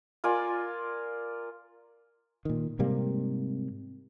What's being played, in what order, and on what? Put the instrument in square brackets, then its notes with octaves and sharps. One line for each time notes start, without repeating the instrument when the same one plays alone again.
[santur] F4 A#4 D5 G#5
[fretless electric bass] A#2 D#3
G#2 C3 G3 A#3